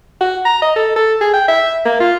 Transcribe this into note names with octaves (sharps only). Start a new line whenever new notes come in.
F#4
A#5
D#5
A4
A4
G#4
G5
E5
A#3
F4